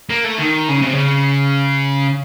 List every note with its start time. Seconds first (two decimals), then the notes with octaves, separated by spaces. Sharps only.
0.09 A#3
0.24 A3
0.38 D#3
0.68 C#3
0.82 C3
0.95 C#3